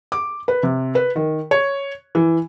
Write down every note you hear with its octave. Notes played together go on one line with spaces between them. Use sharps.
D6
B4
C3
B4
D#3
C#5
E3